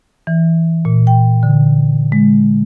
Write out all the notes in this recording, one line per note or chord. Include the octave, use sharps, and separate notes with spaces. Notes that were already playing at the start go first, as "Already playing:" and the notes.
E3
A#2
G5
D3
G#3